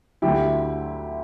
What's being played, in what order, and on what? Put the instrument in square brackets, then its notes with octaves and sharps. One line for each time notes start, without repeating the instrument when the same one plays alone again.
[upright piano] D2 D3 F#3 E4 G4